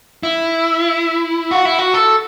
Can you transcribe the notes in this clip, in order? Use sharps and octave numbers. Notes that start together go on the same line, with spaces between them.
E4
F#4
E4
F#4
A4